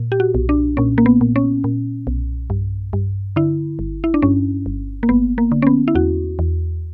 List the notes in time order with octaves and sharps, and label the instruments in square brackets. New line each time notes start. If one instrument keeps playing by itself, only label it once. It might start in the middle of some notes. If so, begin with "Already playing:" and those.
Already playing: [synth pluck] A#2
G4
F#4
B1
D4
A#2 C#4
A#3
B3
A#2
C#4
A#2
B1
G2
G2
D3 E4
G1
E4
D4
G2 C#4
G1
A#3
G1 B3
A#3
D3
C#4
B3
E4
E2 F#4
E2